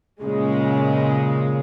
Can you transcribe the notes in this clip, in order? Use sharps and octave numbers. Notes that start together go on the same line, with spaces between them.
A#2 C#3 G#3